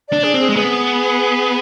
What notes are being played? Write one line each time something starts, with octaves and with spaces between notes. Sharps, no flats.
D4 D5
G#4
C4
G#4
G#3
B3 G#4